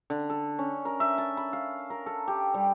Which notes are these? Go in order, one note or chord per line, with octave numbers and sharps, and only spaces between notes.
D3
A4
C#4
A#4
E5
A5
B5
F5
A#4
A4
G4
G3